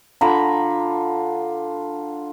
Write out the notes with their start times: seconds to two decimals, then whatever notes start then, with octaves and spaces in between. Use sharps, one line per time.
0.21 D3 F4 A#5 B5